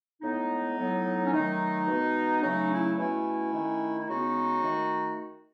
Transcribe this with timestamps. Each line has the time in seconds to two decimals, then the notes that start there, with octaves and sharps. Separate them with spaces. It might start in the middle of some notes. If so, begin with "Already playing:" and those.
0.22 A2 G#3 B3 D#4
0.78 A2 F#3 B3
1.25 C#4
1.33 D#3 F#3 A3 D#4
1.87 B2 G#3 B3
2.43 C#3 F#3 A3 D#4
2.70 C#4 E4
2.97 B2 A3 C#4 E4
3.53 D#3 A3
3.97 E4
4.07 C#3 G#3 B3 D#4 F#4
4.63 D#3 A3